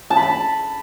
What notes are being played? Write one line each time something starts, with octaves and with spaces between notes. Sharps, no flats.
A5
B5
A5